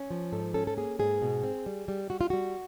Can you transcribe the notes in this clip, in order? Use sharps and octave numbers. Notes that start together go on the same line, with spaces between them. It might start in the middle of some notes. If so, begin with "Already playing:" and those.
Already playing: C#4
F3
G#2 A4
C#4 A4
A4
A#3 G#4
G#2 G#4
B2
C4
G3
G3
G3 F#4
F4
G3 F#4